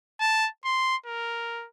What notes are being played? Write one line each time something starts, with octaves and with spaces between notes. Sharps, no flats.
A5
C6
A#4